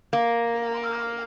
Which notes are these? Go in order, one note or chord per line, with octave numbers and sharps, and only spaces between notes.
A#3